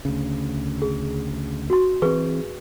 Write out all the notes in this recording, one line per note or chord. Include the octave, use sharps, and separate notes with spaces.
D2 C#3
G#4
F#4 C6
E3 C4 G#4 B4 C#6